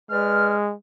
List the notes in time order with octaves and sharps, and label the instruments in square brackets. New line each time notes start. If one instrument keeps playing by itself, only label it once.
[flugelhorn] G#3 [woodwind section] B4 D5 F6